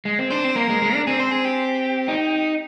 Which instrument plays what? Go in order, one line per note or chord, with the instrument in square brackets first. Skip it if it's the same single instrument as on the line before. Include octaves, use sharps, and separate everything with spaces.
[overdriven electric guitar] G#3
C4
[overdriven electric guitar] D4 [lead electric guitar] C5
[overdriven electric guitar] C4
[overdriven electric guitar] A#3 [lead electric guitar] A#4
[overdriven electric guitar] G#3
G#3
D4
[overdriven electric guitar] C4 [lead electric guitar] G#4
[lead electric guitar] C5
G#4
G4
[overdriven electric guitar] D#4